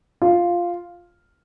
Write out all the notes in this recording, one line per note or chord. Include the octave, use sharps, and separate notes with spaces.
F4